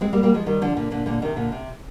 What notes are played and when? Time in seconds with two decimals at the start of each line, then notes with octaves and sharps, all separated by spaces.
0.01 G#3 C4
0.13 G3 A#3
0.23 G3 A#3
0.34 F3 G#3
0.46 D#3 G3
0.62 D3 F3
0.77 A#2 D3
0.91 A#2 D3
1.06 A#2 D3
1.22 C3 D#3
1.36 A#2 D3
1.52 C3